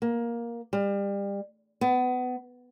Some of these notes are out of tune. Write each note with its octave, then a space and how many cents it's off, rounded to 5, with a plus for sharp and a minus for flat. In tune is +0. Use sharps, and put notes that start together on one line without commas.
A#3 +10
G3 +30
B3 +25